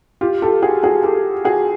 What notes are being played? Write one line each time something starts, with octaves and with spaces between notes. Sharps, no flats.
F4 G4
G4 A4
F#4 G#4
F#4 G#4
G4 A4
F#4 G#4